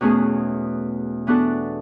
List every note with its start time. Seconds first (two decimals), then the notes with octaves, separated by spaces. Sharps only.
0.01 E2 B2 A3 C#4 G#4
1.27 E3 B3 D4 F#4 A4